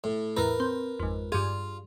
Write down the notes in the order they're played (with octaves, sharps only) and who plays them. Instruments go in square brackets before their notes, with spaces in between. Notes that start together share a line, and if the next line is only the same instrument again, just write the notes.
[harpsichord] A2
[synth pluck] E2 A2 A#5 [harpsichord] A#4 B4
[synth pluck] C4
G#1 F2
[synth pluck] G2 G#4 [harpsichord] F4